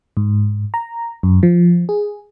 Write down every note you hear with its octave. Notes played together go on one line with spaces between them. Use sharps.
G#2
A#5
F#2
F3
G#4